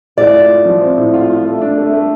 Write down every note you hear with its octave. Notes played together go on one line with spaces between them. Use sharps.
A2 D5
F4
F4
F3
C4
A2
F4
F4
A3
D4
A3
A3